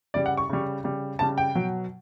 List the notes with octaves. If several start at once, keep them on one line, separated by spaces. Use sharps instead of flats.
C#3 G3 D5
F#5
C#6
C#3 G3
C#3 G3
C#3 G3 A5
G5
B2 F#3